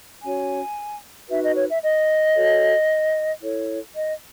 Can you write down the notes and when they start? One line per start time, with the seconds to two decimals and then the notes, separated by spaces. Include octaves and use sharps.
0.23 C#4 F#4 C#5 G#5
1.29 D#4 F#4 B4 E5
1.43 D#5
1.56 C#5
1.70 E5
1.83 D#5
2.35 F#4 A4 C#5
3.41 E4 A4 C#5
3.94 D#5